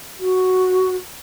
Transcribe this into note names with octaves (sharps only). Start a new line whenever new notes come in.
F#4